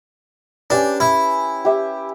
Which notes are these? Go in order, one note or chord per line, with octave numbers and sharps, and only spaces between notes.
C#4 D4 G4 B4
E4
G4 E5